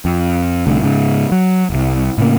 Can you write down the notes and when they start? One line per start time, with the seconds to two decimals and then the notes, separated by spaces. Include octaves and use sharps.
0.05 F2
0.67 C2 A2 D3
0.82 G#2 C#3
1.32 F#3
1.70 D#1 C2
2.18 A2 C#3 A#3